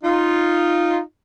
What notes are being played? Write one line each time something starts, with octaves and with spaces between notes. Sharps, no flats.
D#4 F4